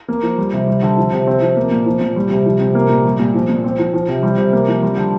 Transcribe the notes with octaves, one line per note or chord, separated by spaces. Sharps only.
A#3
F3
G3
C3
G3
D3
F3
C3
C4
F3
A#3
A#2
F3
A#2
G3
C3
F3
C3
A#3
A#2
G3
A#2
F3
A#2
C4
F3
F3
C3
G3
C3
A#3
F3
G3
D3